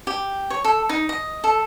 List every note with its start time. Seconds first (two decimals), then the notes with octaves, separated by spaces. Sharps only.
0.07 G4
0.50 C#5
0.65 A4
0.89 D#4
1.09 D#5
1.44 A4